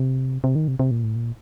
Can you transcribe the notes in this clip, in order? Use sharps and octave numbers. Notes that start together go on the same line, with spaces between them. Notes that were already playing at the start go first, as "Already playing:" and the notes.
Already playing: C3
C3
D#3
C3
C3
A#2
A2
A#2